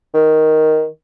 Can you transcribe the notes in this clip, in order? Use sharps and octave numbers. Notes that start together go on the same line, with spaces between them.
D#3